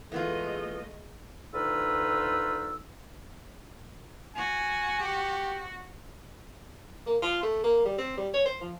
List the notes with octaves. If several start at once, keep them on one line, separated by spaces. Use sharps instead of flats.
E3 G#3 A3 B3 F4 D#5
D2 D#4 F4 B4 E6
F#4 G#5
G4
A#3
F4
A3
A#3
G3
C4
G3
C#5
C5
F3